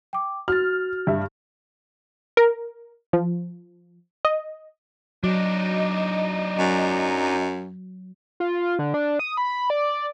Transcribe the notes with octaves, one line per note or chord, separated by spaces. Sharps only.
G5 D6
F#4 F6 A6
G2 E5
A#4
F3
D#5
F#3 D4 D#4 D#5
F#2
F4
D3
D4
D#6
B5
D5